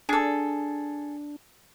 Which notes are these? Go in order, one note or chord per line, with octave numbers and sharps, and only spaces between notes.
D4 G#4 A4